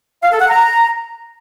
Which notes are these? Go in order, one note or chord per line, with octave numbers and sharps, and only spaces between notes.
F5
A4
F#5
A#5